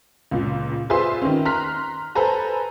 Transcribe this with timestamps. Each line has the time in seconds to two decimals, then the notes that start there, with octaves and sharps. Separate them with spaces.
0.31 C#2 A#2
0.90 F4 G#4 B4 C5 E5 C6
1.22 D#3 C#4
1.45 A#5 C6 F6 F#6 B6
2.15 A4 B4 C5 G#5 A#5 B5